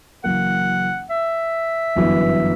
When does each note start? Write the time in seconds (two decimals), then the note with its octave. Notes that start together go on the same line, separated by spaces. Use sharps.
0.24 F#1 F#2 E3 A#3 F#5
1.10 E5
1.96 G1 F#2 E3 B3